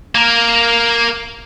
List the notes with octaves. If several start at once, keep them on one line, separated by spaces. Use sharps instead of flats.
A#3 A#4